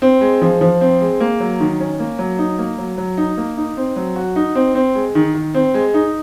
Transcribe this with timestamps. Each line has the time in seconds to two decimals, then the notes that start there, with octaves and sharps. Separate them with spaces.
0.02 C4
0.21 G#3
0.42 F3
0.61 F3
0.81 C4
1.01 G#3
1.20 A#3
1.40 F#3
1.60 D#3
1.80 C#4
2.00 A#3
2.19 F#3
2.39 D#4
2.58 A#3
2.78 F#3
2.98 F#3
3.17 D#4
3.37 A#3
3.57 D#4
3.77 C4
3.96 F#3
4.16 F#4
4.36 D#4
4.55 C4
4.75 C4
4.95 G#3
5.15 D#3
5.35 D#3
5.55 C4
5.74 G#3
5.94 D#4